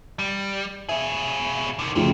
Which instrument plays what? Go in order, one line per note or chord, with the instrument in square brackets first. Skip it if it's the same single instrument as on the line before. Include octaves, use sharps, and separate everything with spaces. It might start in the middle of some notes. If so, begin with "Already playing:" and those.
[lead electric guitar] G3
[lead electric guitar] B2 G#4 [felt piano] E5
[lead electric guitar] D3 D#3
[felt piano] D2 C#3 F3 [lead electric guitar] A3 C4